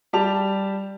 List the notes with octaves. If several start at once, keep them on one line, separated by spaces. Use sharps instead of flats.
G3 G4 A5 F7